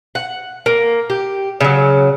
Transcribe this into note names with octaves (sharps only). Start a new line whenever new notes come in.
F#5
A#3
G4
C#3 F#3